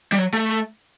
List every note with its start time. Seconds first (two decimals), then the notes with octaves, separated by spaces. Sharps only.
0.12 G3
0.18 F#3
0.33 A3